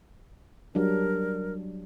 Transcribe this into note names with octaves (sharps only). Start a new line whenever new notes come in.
F#3 G3 D4 A#4